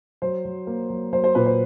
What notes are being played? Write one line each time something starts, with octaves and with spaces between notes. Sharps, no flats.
F#3 C5
F#3
A#3
F#3
F#3 C5
C5
A#2 B4
C5